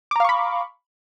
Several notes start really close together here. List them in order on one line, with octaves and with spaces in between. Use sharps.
D6 A#5 F5 C#6 B5